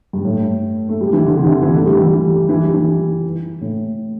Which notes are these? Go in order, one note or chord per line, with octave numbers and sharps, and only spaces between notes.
G2
A2
A3
G3
E3
D3
C3
E3
D3
E3
A3
G3
E3
G3
E3
G3
E3
A2